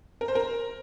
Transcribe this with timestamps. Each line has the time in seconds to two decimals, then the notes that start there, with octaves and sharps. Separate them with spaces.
0.21 A#4
0.28 C5
0.35 A#4